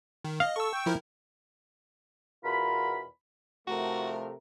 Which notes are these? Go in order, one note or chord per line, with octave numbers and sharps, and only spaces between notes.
D#3
D#5 F5
A4 C#6 E6
G5
F3 E4 A#4
E2 B2 F4 A#4 B5
A2 C3 F3 A3 F#4 A4 A#4